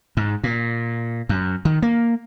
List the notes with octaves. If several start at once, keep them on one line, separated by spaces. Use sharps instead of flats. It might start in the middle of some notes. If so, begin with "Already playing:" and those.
G#2
A#2
F#2
D#3
A#3